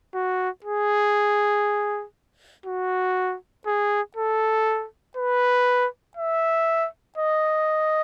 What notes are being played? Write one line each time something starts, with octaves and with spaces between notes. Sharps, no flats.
F#4
G#4
F#4
G#4
A4
B4
E5
D#5